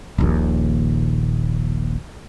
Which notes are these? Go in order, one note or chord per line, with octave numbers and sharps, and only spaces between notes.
D#1 A#1 D#2